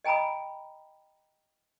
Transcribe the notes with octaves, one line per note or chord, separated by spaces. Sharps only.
D#5 G5 G#5 A#5 B5 D#6